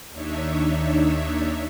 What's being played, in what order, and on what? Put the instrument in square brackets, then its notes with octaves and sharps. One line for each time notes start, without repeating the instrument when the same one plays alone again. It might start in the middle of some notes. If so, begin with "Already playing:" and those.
[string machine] D#2 D4 D#4 C#5 E5